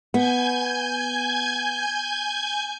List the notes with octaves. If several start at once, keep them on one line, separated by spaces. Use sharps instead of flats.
B3 G#5 G6 G#6